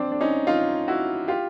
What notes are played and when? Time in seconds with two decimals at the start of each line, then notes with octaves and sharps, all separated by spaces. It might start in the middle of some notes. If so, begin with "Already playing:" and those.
Already playing: C4 D4
0.12 D4
0.21 C#4 D#4
0.47 D#4 F4
0.88 E4 F#4
1.28 F4 G4